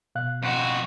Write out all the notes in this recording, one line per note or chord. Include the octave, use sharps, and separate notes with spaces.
B2 F5 F#6
F2 F#4